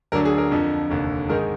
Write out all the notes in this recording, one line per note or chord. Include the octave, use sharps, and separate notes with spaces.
D2 D3 F#3 D4 A#4
G#4
A#4
F2 D3 F3
F1 D#2 D3
G#2 D#3 G#3 D#4 A#4